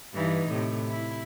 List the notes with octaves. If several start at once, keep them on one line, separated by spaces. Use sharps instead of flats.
G2 E3 D#4
A2 C3
E4